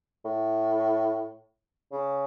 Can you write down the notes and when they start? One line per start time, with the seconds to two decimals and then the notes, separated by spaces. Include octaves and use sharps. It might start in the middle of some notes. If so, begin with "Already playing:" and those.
0.25 A2
1.92 C#3